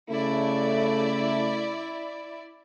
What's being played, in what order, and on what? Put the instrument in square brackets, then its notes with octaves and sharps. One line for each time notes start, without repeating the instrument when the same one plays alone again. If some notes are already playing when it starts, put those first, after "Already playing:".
[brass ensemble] C#3 A3 [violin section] E4 D5